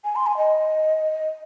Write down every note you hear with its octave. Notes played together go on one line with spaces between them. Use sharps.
G#5
C6
G#5
D#5